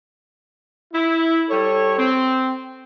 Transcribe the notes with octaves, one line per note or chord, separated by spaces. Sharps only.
E4
G3 A4 C#5
C4